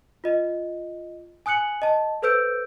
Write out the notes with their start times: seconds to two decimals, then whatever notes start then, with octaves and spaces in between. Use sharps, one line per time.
0.24 F4 D#5
1.46 G#5 D#6 F#6 C#7 F#7
1.82 D#5 A5
2.22 A4 B4 C5 E6 G6 D7